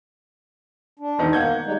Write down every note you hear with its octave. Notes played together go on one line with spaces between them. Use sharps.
D4
E1 D#3 D#4
A#3 F#5 G6 G#6
G3 G#3 D#4